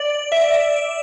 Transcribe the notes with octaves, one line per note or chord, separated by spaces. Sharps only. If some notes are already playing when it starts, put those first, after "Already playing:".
Already playing: D5
E5